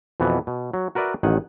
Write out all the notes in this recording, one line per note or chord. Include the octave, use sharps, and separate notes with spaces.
F2 B2 E3 B3
B2
F#3
F#4 A#4 B4 D5 E5
A1 D#3 F#5 G#5